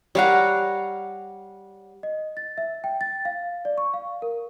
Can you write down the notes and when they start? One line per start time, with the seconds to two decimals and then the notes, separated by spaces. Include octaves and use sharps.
0.15 G3 C#5 F5 F#5 A#5
2.03 D#5
2.37 A6
2.58 E5
2.84 G5
3.01 A6
3.25 F5
3.65 D5
3.78 C#6
3.94 F5
4.22 A#4